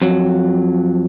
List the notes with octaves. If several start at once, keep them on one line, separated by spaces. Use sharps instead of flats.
F2 F#3